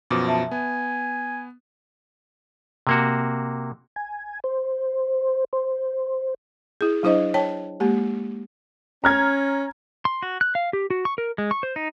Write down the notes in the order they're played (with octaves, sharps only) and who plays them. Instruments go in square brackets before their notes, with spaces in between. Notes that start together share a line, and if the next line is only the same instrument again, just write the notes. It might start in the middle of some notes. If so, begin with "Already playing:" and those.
[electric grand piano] F#2 B2 F3 [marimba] D6
[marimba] E5 A5
[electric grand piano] B3 [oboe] G#5
[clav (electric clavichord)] C3 A#3 F#4
[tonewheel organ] G#5
C5
C5
[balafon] E4 G#4
F#3 D4 E4 C5 D#5
C#5 G5 A5
G#3 A#3 G4
[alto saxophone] C#4 [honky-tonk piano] A#5 F6 G#6
[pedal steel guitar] C6
F#4
F#6
F5
G4
F#4
C#6
A#4
G#3
C#6
C5
D#4